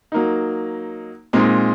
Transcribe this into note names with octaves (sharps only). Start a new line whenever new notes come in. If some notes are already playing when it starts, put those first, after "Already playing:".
F#3 A#3 D#4
A#2 G#3 C4 D#4